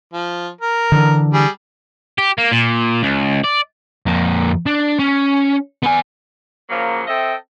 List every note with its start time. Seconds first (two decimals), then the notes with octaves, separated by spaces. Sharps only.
0.13 F3
0.61 A#4
0.92 D3 E3
1.34 G3 G#4
2.18 G4
2.38 A#3
2.52 A#2
3.03 C#2
3.44 D5
4.06 F2 A#3
4.66 D4
4.99 C#4
5.83 B3 G#5
6.70 C#3 F3 F#3 A#3
7.07 C4 A4 D#5 E5 G5